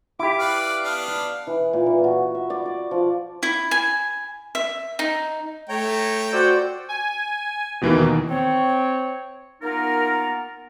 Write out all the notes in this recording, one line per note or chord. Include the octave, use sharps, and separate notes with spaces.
E4 G4 D6
B4 D5 F5
B3 D4 F5
E3
A#2
E3
F#4
E5
D5
D5
F3
E4
G#5
E5
D#4
A3 C#5 G5 A#5
F#4 C5 D5 E6 G6
G#5
D#2 B2 E3 A#3
C4 C#5
A#3 B3 D#4 F4 A#4